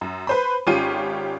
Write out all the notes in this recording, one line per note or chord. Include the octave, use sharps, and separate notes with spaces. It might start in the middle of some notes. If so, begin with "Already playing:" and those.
F#2
B4 C5 B5
G#1 C#4 F4 G4 D#7